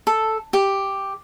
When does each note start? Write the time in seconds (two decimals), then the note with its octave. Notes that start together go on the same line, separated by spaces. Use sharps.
0.07 A4
0.53 G4